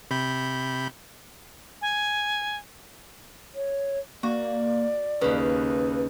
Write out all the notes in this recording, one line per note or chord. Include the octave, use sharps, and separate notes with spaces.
C3 B5 G6
G#5
C#5
A#3 F#4 D5
D#2 C#3 B4 B5